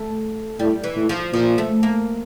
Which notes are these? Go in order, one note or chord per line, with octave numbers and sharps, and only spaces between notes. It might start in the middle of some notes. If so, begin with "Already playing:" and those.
Already playing: A3
A2 G3
E3
A2
F3
A#2 F3
A3
A#3